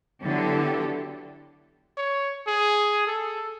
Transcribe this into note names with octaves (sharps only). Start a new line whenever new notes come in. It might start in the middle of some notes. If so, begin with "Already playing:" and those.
D3 F#3 B3 E4 G4 A4
C#5
G#4
A4